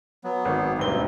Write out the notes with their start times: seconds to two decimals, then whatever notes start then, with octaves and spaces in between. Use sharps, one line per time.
0.24 F#3 B3
0.45 G#1
0.79 E1 D2 G2 C4 G7